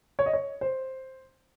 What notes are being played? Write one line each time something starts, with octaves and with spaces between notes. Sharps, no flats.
C#5
D#5
C#5
C5